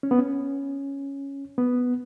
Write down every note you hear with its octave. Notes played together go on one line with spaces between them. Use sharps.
C#4
B3
C#4
B3